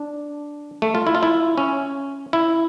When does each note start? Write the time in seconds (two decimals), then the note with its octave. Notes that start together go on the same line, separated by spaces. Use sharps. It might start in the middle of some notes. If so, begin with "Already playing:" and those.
Already playing: D4
0.82 A3
0.95 F4
1.07 E4
1.15 F4
1.23 E4
1.58 C#4
2.33 E4